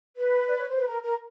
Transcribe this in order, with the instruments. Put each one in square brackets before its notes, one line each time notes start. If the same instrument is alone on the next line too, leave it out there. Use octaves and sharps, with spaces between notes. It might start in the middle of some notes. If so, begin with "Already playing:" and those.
[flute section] B4
D5
C#5
C5
B4
A#4
A#4